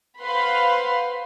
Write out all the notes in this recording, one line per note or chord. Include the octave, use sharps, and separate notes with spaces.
B4 C5 F5 F#5 B5 C6